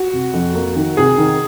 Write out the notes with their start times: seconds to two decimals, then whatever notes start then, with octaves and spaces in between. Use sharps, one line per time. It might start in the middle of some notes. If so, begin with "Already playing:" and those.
Already playing: F#4
0.13 C3
0.34 F2
0.55 A#3
0.76 D#3
0.97 C3 G#4
1.18 D#3